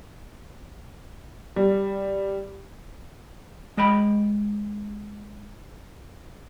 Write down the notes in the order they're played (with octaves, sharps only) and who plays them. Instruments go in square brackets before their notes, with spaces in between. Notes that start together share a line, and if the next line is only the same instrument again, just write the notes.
[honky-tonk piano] G3
[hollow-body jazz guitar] G#3 D#5 G5 B5